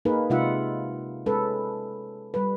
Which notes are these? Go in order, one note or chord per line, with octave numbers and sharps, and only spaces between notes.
A#3 D#4 G#4 A#4 B4
C3 G#3 D#4 F4 E5 F#5
G#3 C#4 A4 B4
G3 B4